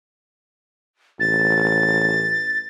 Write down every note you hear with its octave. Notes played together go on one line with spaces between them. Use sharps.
A1 A6